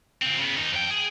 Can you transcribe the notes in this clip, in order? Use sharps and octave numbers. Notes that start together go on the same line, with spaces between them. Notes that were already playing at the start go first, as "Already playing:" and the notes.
A#2 C4
C#3 B3
D#2 D#4
F2 G5
G#4